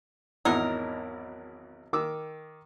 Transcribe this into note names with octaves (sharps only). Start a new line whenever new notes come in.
G#1 E2 F#3 D#4 E4 A#4
D#3 D6 E6